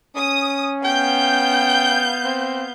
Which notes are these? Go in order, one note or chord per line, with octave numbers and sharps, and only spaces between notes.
C#4 D#6
B3 F5 G5 G6
C4